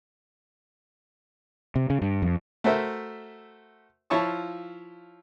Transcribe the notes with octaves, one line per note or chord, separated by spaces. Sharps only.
C3
C#3
G2
F2
A3 F#4 A#4 C5 E5
F3 E4 F4 C#5 A5 C#6